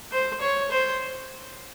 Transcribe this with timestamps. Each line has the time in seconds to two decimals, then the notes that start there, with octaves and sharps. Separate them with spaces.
0.12 C5
0.41 C#5
0.70 C5